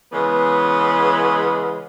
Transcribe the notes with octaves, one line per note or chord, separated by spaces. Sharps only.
C#3 E3 G#3 B3